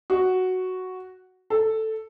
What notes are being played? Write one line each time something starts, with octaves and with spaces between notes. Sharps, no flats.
F#4
A4